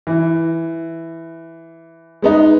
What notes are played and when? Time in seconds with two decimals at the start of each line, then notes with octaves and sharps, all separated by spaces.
0.07 E3
2.22 G#3 B3 D#4